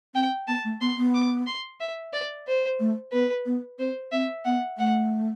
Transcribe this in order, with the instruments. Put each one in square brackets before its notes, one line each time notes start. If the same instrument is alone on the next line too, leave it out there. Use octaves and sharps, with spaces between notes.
[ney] C4 [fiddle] G5
[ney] B3 [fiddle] A5
[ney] A3
[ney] B3 [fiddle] C6
[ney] B3
[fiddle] D6
C6
E5
D5
C5
[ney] A3
[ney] B3 [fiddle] B4
[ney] B3
[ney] C4 [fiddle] C5
[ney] C4 [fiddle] E5
[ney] B3 [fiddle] F#5
[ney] A3 [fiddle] F#5